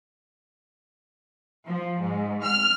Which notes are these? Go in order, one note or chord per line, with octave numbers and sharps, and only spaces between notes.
F3
G#2
F6